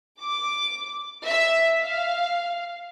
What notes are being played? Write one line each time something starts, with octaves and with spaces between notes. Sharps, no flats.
D6
E5
F5